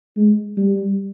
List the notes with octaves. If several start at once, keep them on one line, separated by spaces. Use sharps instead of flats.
G#3
G3